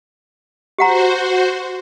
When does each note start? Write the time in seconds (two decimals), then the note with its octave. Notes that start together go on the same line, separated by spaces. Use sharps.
0.78 F#4 G4 C5 F#5 A#5